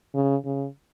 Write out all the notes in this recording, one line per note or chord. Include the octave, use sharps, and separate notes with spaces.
C#3
C#3